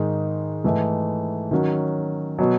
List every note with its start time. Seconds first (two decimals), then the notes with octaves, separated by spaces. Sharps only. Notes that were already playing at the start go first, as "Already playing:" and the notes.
Already playing: G#2 D#3 G#3
0.64 G#2 E3 A3
1.51 D#3 F#3 C#4 F#4
2.39 B2 F#3